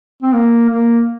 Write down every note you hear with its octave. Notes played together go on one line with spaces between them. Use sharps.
C4
A#3
A#3